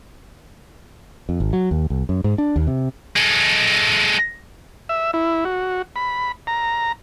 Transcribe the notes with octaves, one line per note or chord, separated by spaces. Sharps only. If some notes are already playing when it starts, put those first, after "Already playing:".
F2
G#1
F#3
D#2
C2
F#2
G#2
D4
D#2
C3
G#3 A4
E5
E4
F#4
B5
A#5